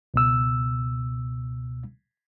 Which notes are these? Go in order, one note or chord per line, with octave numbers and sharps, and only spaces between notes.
C#2 B2 E6